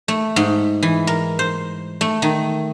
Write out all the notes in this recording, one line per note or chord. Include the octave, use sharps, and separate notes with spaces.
A3
G#2
E3
A#4
C5
A3
D#3